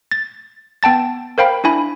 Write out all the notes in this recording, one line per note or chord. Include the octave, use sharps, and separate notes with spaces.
A6
B3 G5 A5 A6
A#4 C5 F5 G5 B5
D4 E4 G#5 B5